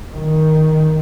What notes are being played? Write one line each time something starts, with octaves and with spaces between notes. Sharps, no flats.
D#3